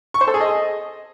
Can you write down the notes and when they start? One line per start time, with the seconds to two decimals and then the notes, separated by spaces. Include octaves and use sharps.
0.14 C#6
0.21 C5
0.27 A4
0.34 G#4
0.41 D#5